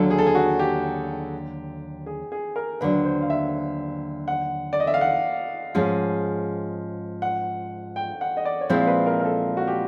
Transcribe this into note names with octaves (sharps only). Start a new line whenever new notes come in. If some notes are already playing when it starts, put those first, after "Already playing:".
Already playing: D#2 D3 F#3 A4
G#4
A4
G#4
F#4
G4
G#4
G#4
A#4
D#2 D3 F#3 B4
C5
F5
E5
F#5
D5
D#5
E5
F5
F#5
G#2 F3 G#3 C#4
F#5
G5
F#5
D#5
D5
C#5
A#2 F3 G#3 C4 E4 C5
B4
A#4
A#4
A4
F#4
G4